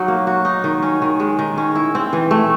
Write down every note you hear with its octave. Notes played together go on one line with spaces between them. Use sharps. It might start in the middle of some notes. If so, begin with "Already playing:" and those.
Already playing: F#3 D#4
A#3
F#4
D#4
D#3
C#4
D#3
G#3
D#3
C#4
E4
C4
E3
A3